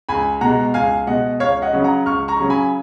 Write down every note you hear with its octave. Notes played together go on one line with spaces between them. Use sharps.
C#2 G#5 B5
B2 G#3 F#5 A#5
C#2 F5 G#5
B2 G#3 D#5 F#5
C#2 C#5 F5
D#5 F#5
C#3 F#3 C#4
F#5 A#5
C#2 C#6 F6
A#5 C#6
C#3 F#3 C#4
G#5 B5